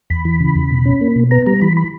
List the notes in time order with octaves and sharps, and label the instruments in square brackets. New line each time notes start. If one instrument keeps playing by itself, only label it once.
[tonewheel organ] E2 B5
E3
C#3
E2
B2
C#4
A#3
B2
B3 A#5
G3 A#5
E3 B5
B5